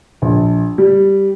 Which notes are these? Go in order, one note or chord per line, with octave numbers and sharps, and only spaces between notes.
A#1
G3